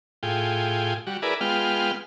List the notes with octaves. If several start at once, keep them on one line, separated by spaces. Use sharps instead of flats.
A2 F4 G#4 G5
G3 F#4
E4 G#4 A#4 B4 D5
G#3 B3 F4 G5 F6